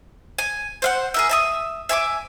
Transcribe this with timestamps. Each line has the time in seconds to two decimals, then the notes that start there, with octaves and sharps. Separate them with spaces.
0.38 G#5
0.82 C5 F5 F#5
1.14 G#4 A#4 E5
1.29 E5 A5 D#6
1.89 E5 G#5 C#6 D6